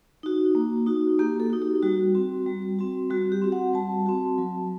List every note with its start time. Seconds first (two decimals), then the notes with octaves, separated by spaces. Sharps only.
0.23 D#4 F#4
0.55 A#3
0.86 D#4 F#4
1.19 A#3 G4
1.40 A4
1.50 D#4 F#4
1.62 G4
1.83 G3 F#4
2.15 C4 F#4
2.46 G3
2.79 C4 F#4
3.10 G3 F#4
3.32 G4
3.42 C4 F#4
3.52 F#5
3.74 G3 A5
4.06 C4 F#4
4.38 F#3